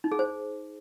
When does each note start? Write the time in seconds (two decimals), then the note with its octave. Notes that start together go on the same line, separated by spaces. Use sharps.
0.04 D#4
0.12 G#4
0.19 C5